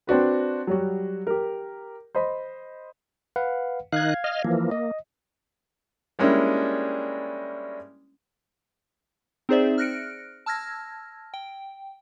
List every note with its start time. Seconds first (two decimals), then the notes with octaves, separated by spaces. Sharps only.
0.07 C4 D4 F#4 B4
0.67 F#3 G3 F#4
1.27 G4 A#4
2.15 C5 D#5 B5
3.36 B4 F5 F#5
3.93 D#3 D#4 F5 F#6 G#6
4.24 D#5 F6
4.44 E3 F3 A#3
4.71 A#3 D#5
6.19 G3 G#3 A#3 C#4 D4 E4
9.49 C4 D#4 G#4 C5 D5 E5
9.78 F6 F#6 A#6 C#7 D7
10.46 A5 E6 F6 G#6 A#6
11.34 G5